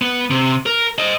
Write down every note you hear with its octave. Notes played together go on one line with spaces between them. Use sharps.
B3
C3
A#4
C5 D#5